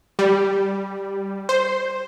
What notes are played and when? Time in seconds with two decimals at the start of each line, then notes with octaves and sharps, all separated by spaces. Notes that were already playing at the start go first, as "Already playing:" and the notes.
0.19 G3
1.49 C5